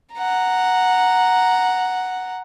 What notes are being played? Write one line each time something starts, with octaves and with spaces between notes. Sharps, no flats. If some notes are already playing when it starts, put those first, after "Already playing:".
F#5 A#5